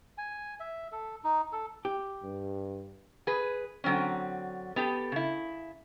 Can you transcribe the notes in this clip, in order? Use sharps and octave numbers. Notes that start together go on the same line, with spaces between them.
G#5
E5
A4
D#4
A4
G4
G2
G#4 B4
D3 F#3 C4 C#4
B3 G4 A4
C#3 E4